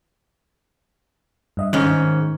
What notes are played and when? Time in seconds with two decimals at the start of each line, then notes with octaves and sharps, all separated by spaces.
1.57 G2 D#5 E5
1.73 G#2 D#3 C#4